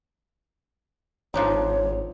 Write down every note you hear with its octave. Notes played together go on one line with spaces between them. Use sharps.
G#1 F3 D4 D#4 C#5